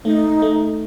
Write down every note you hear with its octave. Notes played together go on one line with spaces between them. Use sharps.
A3 D#4
A3